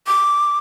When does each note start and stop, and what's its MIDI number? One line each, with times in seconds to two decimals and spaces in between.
0.07 0.58 86